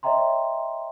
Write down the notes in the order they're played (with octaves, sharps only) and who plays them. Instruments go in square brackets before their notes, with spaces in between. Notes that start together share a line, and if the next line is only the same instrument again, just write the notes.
[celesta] C#5 D#5 E5 G5 A#5 C6